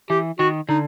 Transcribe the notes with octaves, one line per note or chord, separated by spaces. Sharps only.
E3 G4
D#3 F#4
D3 D#4